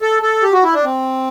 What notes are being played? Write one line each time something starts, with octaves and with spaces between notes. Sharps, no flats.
A4
A4
G4
F#4
E4
D4
C4